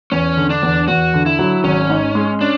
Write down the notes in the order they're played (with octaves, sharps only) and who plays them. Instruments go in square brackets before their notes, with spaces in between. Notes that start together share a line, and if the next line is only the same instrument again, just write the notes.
[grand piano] E2 [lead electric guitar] C#4
[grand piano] D3
[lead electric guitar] D4
[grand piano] E2
[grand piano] E2 [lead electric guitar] F#4
[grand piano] D3
[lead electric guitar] E4
[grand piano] F#3
[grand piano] G#1 [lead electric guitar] C#4
[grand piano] G#2
G#3
[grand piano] C#4 [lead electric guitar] D4